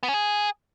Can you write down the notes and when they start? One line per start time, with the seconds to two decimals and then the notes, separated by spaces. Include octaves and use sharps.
0.03 B3
0.08 C#4
0.14 G#4